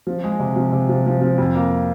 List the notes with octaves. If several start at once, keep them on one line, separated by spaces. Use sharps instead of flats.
F3
G#3
C3
F3
C3
F3
F3
F3
F2
A#3